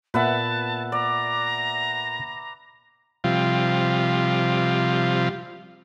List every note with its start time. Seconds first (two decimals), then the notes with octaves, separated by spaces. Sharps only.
0.14 A#2 B3 B4 E5 F#5 A5
0.92 D5 A#5
3.24 C3 F3 G3 F4